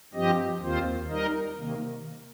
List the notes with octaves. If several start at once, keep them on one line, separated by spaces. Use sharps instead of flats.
G2 F3 C4 G4 D#5
D#2 D#3 C4 F4 C5
G3 D#4 A#4 D#5
C3 D#3 A#3